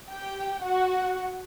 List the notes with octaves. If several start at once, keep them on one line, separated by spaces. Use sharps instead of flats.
G4 G5
F#4 F#5